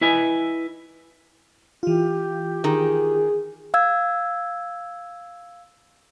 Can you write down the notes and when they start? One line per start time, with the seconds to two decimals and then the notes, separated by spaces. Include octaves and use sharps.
0.01 E4 B4 D#5 G#5
1.83 E3 F4 G4
2.64 D#3 G#4
3.74 F5 E6 G#6